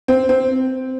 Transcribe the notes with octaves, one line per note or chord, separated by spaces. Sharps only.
C4
C4